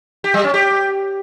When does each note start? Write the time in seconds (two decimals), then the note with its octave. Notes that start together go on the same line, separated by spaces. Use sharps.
0.24 G4
0.34 G3
0.44 C#4
0.54 G4